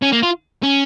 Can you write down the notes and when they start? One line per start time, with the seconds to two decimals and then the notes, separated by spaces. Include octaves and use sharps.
0.02 C#4
0.12 A#3
0.23 F4
0.63 C#4